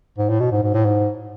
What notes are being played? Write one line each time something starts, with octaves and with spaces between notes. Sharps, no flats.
G#2
A2
B2
G#2
G#2
A2
G#2